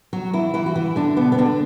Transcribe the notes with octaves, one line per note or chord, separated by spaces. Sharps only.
F#3 F#4
E3 E4
E3 E4
F#4
E3 E4
D3 D4
B2 B3
B3
D3 D4